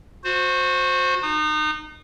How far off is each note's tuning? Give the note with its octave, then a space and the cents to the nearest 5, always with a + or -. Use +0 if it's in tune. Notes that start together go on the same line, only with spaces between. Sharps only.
F#4 -25 C5 +0
D#4 -30 D#6 -30